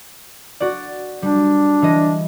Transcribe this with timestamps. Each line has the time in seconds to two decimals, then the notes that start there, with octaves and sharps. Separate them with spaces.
0.60 F#4 D5
1.22 G3 D4
1.82 E3 D#5